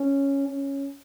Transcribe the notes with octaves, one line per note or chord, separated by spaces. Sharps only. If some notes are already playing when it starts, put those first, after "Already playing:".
Already playing: C#4
C#4